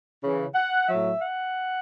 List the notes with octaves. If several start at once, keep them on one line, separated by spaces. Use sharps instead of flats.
C#3 E3
F#5
A2 F#3 E5
F#5